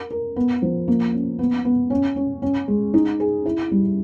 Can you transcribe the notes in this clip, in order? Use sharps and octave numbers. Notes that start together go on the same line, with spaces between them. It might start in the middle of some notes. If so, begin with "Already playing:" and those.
Already playing: A#4
A#4
B3
F3
A#3
C#4
B3
B3
C#4
C#4
C#4
G#3
D#4
G#4
E4
G3